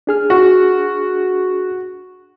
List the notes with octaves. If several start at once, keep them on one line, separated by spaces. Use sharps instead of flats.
D4 G#4 F6
F#4